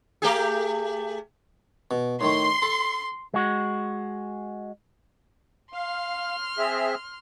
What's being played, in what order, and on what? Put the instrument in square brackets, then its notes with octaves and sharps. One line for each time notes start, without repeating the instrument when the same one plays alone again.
[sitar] A3 G4 G#4
[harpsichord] B2
[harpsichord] A2 D#3 A3 [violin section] C6
[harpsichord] A4
[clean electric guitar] G#3 F#4
[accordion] F5 [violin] C6 F6
[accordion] C4 G#4 E5